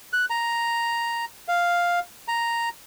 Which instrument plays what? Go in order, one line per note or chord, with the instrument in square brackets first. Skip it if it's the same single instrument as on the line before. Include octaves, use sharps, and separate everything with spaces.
[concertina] F#6
A#5
F5
A#5